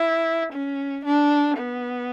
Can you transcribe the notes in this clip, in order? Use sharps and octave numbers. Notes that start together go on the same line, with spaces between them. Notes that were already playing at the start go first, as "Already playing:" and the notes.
Already playing: E4
C#4
D4
B3